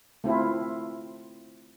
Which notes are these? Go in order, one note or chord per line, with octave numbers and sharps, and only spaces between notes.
A3 C4 E4 F4